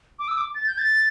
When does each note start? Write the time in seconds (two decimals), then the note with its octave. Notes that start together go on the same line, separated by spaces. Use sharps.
0.19 D6
0.28 E6
0.37 D6
0.55 A6
0.67 G6
0.78 A6